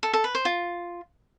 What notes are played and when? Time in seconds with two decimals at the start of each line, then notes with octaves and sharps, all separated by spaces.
0.03 A4
0.13 A4
0.24 B4
0.35 C5
0.45 F4